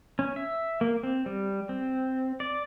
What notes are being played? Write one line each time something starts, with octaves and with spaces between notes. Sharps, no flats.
C#4
E5
A#3
C4
G3
C4
D5